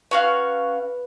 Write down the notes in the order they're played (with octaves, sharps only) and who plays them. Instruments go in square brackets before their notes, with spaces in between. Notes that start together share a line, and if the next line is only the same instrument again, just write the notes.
[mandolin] C#4 F#4 F5 [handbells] B4